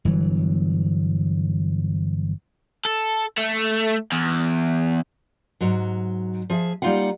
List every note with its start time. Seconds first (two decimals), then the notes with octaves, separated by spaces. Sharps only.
0.05 G1 E3 F#3
2.86 A4
3.38 A3
4.12 E2
5.61 G#2 F#3
6.50 F3 G#4 E5
6.82 G3 A#3 D#4 F4 F5 F#5